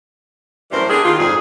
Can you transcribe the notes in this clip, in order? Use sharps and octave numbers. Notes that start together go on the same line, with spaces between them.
F#2 A2 E3 G3 A#4 C5
B3 D4 G4 G#4
D#3 A#3 F4
F2 G#2 B2 G3 G#4